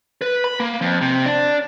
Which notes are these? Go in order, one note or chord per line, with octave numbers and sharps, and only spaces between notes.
B4
B5
A#3
F2
C3
D4